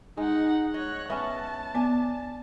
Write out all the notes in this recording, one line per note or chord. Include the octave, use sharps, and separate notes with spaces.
G#3 D#4 F#5
C#5 D#5 F#6
B3 C#4 D#5 E5 A5
B3 D4 G#5